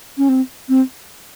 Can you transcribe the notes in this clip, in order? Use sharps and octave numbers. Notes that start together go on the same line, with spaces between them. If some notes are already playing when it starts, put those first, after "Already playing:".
C#4
C4
C4